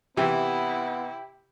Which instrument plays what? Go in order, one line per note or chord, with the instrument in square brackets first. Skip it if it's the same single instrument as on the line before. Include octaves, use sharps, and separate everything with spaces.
[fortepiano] C3 E3 [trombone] B3 [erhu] E4 [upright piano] G4